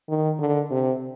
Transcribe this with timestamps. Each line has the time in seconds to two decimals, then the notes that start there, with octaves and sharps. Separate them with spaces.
0.09 D#3
0.39 D3
0.70 C3